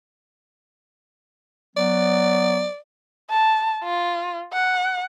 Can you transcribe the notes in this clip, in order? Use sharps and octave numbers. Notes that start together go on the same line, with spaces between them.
F#3 B3 D5
A5
F4
F#5